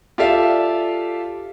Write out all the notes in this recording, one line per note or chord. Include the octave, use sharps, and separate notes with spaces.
F4 G4 A4 D5 E5 F5